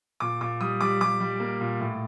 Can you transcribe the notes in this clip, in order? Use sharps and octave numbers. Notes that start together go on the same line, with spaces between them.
A#2 D6
A#2 D6
G3 D#6
G3 D6
G3 D6
G3
A#3
A#2
A2